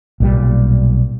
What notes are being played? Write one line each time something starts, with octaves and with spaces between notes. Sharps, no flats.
B1 A#2 G3